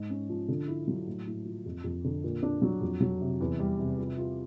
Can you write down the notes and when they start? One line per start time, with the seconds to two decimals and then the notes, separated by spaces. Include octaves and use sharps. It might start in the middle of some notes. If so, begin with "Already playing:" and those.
Already playing: G#2
0.10 C#4
0.29 F3
0.48 D3
0.68 E4
0.88 F#3
1.07 A2
1.27 A2
1.45 F3
1.66 F2
1.84 F2
2.04 D3
2.24 A#2
2.43 D4
2.62 F#3
2.81 F2
3.01 F#3
3.21 C3
3.40 E2
3.59 G3
3.79 C3
3.98 F3
4.18 F4